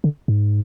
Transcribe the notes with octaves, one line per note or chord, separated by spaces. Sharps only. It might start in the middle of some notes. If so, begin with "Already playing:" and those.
D3
G#2